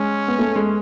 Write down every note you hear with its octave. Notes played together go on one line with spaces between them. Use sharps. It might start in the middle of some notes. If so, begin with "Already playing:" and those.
Already playing: G#3 C#4
B3
A3
G#3